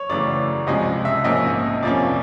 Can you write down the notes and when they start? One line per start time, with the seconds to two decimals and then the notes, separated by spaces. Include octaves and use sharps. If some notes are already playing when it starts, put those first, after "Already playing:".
Already playing: C#5
0.09 F#2 C#3 E3 A3 D5
0.67 C#2 C3 F3 G#3 C#4 D#5
1.05 E5
1.24 A#1 G#2 F3 A#3 C#4 D#5
1.83 F2 C3 F3 A#3 C#4 D5